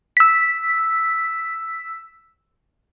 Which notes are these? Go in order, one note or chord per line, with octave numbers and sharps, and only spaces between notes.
E6 B6